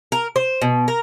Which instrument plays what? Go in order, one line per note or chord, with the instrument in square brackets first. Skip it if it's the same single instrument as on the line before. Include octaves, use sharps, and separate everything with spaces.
[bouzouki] A#4
C5
B2
A#4